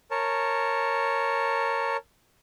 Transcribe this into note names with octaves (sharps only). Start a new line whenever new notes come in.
A#4 C#5 A5